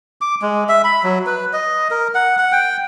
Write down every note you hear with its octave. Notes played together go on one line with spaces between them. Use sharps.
D6
G#3
E5
B5
F#3
B4
D#5
A#4
F#5
F#5
G5